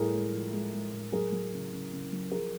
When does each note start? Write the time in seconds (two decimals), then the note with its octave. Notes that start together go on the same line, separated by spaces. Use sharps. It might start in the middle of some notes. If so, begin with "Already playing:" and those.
Already playing: A2 G3 G#4 A#4
0.14 G#3
0.33 F3
0.52 G#3
0.73 G#3
0.93 A2
1.12 F#3 G#4 A#4
1.32 F#3
1.53 C#3
1.72 C#3
1.92 C#3
2.12 F#3
2.32 F3 G#4 A#4